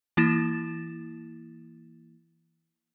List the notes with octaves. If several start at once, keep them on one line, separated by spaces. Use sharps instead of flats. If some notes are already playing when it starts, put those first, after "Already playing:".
E3 A#3 E4 A6 A#6 E7